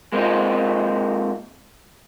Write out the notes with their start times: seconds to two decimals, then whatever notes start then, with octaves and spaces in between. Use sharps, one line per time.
0.12 G#3 A#3 C4 C#4 D#4 F4